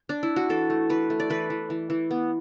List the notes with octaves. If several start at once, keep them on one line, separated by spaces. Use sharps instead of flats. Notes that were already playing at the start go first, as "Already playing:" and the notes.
Already playing: B3
D4
E4
F#4
E3 A4
A3
E3 B4
A3
D5
E3 B4
E3
E3
E3
B3